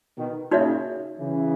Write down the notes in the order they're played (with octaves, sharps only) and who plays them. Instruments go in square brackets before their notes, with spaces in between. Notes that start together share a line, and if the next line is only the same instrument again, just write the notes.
[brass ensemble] B2 D#3
[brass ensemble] A#2 C#3 [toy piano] D#4 F#4 C#5 E5
[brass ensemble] C#3 E3